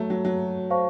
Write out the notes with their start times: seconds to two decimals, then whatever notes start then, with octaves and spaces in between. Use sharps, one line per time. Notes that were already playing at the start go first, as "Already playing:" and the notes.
Already playing: F#3 A3 A4 C#5 A5
0.10 F#3
0.25 F#3
0.70 C5 F5 A5 C#6